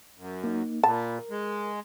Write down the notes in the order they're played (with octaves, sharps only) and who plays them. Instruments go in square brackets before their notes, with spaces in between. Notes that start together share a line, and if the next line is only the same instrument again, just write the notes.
[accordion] F#2
[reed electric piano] A#3 D#4
[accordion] A#2 [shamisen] A5 [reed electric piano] B5
[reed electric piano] A#4
[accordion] G#3